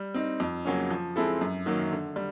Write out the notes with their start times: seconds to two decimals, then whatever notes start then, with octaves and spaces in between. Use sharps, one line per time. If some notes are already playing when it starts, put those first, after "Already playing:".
Already playing: G3
0.14 C4 D#4
0.40 F2
0.65 C#3 F#3 A#3 C#4
0.90 F3
1.16 G#3 C4 E4 A4
1.41 F#2
1.66 D#3 F#3 A#3
1.91 D3
2.16 G3